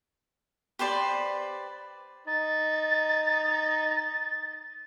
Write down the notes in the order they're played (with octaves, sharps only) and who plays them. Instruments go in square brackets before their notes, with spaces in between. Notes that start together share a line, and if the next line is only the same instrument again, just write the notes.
[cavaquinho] G4 B4 C5 D5
[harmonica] D#4 [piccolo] A6